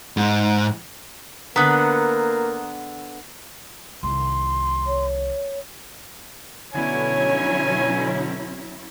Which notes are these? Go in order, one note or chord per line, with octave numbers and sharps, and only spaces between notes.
G#2
D3 A#3 B3 A#5 D#6 F#6
C2 D#3 C6
C#5
B2 D3 F#3 C#4 E4 C#5 G#5